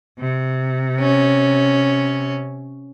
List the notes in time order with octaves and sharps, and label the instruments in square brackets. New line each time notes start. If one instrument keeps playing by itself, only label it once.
[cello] C3
[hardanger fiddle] C#4